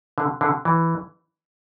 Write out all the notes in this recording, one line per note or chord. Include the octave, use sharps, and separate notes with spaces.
D3
D3
E3